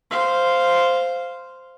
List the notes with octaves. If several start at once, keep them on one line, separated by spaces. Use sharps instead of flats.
C5 F5